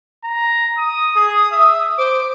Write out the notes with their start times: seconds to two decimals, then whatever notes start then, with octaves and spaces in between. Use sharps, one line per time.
0.24 A#5
0.77 D#6
1.16 G#4 D#6
1.51 E5
1.98 C5 D6